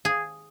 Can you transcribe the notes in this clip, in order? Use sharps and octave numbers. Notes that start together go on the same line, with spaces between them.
G#4